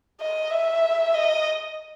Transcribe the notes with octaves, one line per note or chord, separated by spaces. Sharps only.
D#5
E5
D#5